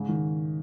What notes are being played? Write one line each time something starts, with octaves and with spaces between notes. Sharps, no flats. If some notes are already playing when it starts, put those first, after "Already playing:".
Already playing: G#2 C#3
D#3